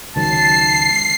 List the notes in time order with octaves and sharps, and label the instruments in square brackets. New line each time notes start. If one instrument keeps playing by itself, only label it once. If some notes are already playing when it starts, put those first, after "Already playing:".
[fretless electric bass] C#2 D#3 F#3 [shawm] A5 [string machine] C7